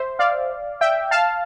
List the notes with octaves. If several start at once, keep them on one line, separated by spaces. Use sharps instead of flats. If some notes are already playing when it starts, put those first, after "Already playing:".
Already playing: C5 E5
D5 F5
E5 G5
F5 A5